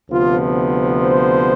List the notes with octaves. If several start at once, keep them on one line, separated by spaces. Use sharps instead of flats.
D2 C3 F3 B3 F4
C5